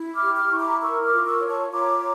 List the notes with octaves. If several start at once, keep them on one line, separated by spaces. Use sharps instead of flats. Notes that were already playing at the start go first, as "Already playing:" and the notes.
Already playing: E4
D6 F6
G4
D6 F6
E4 C#6
A#5 D6
A#4 C#6 E6
D6 F6
F4
C#6 E6
C#5
A5 C#6
F4 A#5 D6